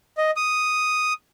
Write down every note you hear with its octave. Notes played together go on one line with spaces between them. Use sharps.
D#5
D#6